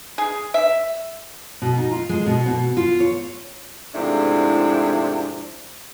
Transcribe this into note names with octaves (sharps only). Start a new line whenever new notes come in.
G#4
E5
B2
D#4
F4
G#3
B2
B2
F4
C#5
G#2 C3 F3 A3 D4 E4